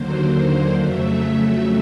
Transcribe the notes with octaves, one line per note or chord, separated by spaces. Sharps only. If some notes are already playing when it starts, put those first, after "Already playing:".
Already playing: D#2 D3 F#3 A#3 C5
F2 C#3 F#3 A3 E5